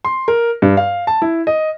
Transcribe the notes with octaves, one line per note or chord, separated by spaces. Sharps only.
C6
A#4
G2
F5
A5
E4
D#5